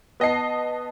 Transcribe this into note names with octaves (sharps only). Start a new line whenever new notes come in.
B3 D#5 A5 C7